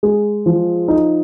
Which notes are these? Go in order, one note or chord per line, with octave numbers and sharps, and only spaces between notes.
G#3
F3
D#4